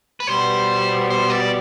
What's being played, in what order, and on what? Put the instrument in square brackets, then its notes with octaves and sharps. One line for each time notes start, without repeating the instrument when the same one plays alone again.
[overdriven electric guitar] B4
[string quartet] B2 G3 B3 [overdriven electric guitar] C5
[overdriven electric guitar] C5
D5